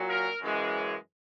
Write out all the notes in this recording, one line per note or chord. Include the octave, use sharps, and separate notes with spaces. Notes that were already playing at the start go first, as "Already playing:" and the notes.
Already playing: A#2 F#3
A#4
F#2 C#3 E3 G#3